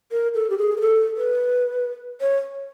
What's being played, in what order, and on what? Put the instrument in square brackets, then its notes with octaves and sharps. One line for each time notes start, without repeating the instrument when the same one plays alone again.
[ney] A#4
A4
G4
G#4
A#4
A4
B4
C#5